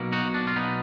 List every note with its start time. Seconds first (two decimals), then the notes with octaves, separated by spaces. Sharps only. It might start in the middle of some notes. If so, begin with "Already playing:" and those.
Already playing: B1 B2 A#3
0.12 D#4 F#4
0.34 D4
0.47 F4
0.56 B3 D#4